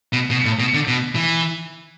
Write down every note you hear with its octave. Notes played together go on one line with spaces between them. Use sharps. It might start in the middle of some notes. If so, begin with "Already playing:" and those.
B2
B2
A2
B2
D3
B2
E3